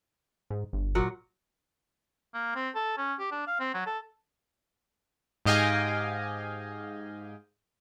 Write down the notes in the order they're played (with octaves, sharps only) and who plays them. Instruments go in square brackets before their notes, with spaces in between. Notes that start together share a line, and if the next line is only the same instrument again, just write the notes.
[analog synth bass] G#2
G1
[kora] A#2 F#3 F#5
[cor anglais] A#3
C4
A4
C#4
G4
D4
F5
C4
F#3
A4
[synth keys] G#2 G4 D#5 F5 G5 G#5